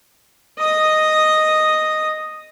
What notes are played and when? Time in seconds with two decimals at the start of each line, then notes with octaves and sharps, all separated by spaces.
0.59 D#5 D#6